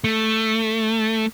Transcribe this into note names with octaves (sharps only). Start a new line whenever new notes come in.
A3